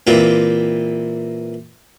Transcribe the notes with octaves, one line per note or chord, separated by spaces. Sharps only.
A#2 E3 A#3 C4 G4